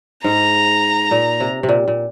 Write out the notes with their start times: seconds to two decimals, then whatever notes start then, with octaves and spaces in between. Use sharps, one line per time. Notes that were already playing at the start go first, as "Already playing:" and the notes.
0.24 G#2 A#5
1.11 A#2
1.40 C3
1.63 C3
1.69 A#2
1.88 A#2